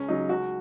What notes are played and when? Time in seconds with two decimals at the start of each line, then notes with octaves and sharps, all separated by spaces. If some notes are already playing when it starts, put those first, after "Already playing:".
Already playing: C#2 C#4
0.08 C#3 F#3 D#4
0.29 C#2 F#4